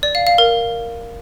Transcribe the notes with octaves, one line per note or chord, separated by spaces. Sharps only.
D5
F5
F5
A#4